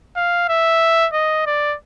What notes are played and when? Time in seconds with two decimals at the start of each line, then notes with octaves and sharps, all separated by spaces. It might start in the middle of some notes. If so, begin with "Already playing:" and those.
0.16 F5
0.49 E5
1.13 D#5
1.46 D5